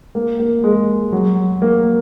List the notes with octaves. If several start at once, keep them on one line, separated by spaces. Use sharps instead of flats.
A#3
A#3
G#3
F#3
A#3